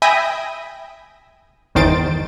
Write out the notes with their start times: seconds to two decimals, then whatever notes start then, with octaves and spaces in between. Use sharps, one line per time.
0.02 E5 G5 G#5 B5 D#6 A#6
1.75 G1 E2 D#3 C5 A6 D7